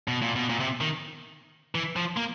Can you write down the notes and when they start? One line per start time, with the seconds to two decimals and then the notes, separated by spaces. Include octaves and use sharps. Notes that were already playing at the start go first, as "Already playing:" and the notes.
0.08 B2
0.22 A#2
0.36 B2
0.49 A#2
0.60 C3
0.81 D#3
1.75 E3
1.96 F3
2.17 A#3